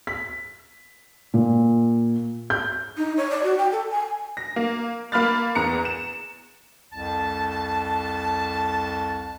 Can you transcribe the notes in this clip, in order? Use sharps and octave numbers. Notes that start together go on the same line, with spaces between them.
B6
A#2
G6
D#4
C#5
D5
F#4
G5
A4
G#5
A#6
A#3
A#3 B5 F6 A6
E2 A#5 C#7
E7
C2 F2 A5